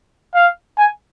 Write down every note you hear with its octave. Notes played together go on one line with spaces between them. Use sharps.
F5
G#5